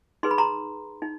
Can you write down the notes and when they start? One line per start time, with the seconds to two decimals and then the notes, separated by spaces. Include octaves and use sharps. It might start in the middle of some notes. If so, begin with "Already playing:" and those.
0.23 D#4 G#4 B4 C6
0.31 B5
0.38 A#5 C6
1.02 D#4